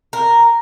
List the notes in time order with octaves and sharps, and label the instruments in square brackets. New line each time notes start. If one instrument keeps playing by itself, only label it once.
[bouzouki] A#4